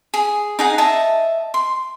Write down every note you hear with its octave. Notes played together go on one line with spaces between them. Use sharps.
G#4
D#4 G#4 F#5
D#5 E5 A5
C6